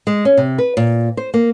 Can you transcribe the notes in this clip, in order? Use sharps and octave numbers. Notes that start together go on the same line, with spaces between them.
G#3
C#4
C3
B4
A#2
C5
A#3